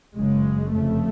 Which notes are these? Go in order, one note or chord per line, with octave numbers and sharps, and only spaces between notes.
F#1 F#2 C#3 G#3
F1 F2 C#3 A3